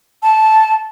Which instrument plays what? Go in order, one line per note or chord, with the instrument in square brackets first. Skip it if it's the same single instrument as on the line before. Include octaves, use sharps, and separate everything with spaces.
[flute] A5